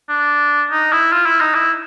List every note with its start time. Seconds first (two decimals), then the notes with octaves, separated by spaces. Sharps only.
0.09 D4
0.71 D#4
0.93 E4
1.12 F4
1.26 E4
1.40 D#4
1.54 E4